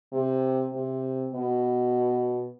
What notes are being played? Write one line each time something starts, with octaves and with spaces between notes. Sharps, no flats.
C3
C3
B2